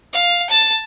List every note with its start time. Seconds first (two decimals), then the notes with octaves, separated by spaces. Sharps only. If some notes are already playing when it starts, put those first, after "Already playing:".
0.13 F5
0.50 A5